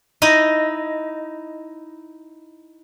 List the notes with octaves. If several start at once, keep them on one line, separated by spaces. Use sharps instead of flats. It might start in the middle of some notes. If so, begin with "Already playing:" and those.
D#4 E4 D#5